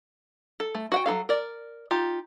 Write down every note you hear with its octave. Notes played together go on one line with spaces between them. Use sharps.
A4
A3
F#4 F#5 G5
F#3 D#4 A4 F5
A#4 D5
D#4 F4 G4